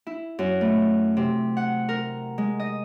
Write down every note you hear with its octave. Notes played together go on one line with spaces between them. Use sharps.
E4
F#2
A3
C3
F#5
A#4
G#3
D#5